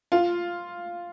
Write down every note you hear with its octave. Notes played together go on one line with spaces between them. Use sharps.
F4